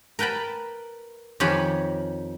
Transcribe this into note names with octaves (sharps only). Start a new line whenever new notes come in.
A#4 B4 G5 A5 B5
F2 D#3 G4 C#5 G#5 B5